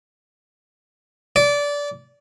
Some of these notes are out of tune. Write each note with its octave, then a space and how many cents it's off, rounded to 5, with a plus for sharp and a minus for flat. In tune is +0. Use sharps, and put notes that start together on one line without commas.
D5 -20